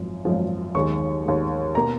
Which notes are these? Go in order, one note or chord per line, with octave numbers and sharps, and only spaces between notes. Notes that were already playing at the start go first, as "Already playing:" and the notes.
Already playing: G#1 F#2 F3
G#1 F#2 F3
D#2 D#3 G#3 C#6
D#2 D#3 G#3
B2 A#3 A#5